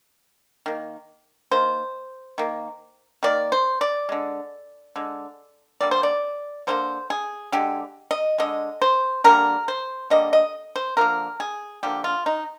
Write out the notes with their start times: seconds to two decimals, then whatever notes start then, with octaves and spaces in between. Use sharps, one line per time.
0.66 D#3 A#3
1.51 D#3 A#3 C5
2.38 D#3 A#3
3.23 D#3 A#3 D5
3.52 C5
3.81 D5
4.09 D3 G#3
4.96 D3 G#3
5.81 D3 G3 A#3 D5
5.91 C5
6.03 D5
6.67 D3 G3 A#3 C5
7.10 G#4
7.52 D3 G#3 G4
8.11 D#5
8.38 D3 G#3 D#5
8.82 C5
9.24 D3 G3 A#3 A#4
9.68 C5
10.10 D3 G3 A#3 D#5
10.33 D#5
10.76 C5
10.97 D3 F3 A#3 A#4
11.40 G#4
11.83 D3 F3 A#3 G4
12.04 F4
12.26 D#4